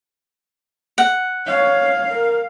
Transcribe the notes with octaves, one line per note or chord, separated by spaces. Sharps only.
F#5
C#5 F5
A#4